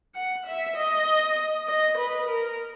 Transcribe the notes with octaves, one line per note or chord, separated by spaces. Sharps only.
F#5
E5
D#5
D#5
B4
A#4